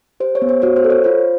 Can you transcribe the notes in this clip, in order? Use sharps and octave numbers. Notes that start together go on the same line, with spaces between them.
G4 C5
C#5
B3
C5
F#4 C#5
C5
A4
C#5
F4 C5